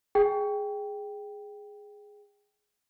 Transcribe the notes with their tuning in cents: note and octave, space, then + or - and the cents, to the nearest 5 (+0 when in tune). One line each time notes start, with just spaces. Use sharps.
G#4 +0 G5 +0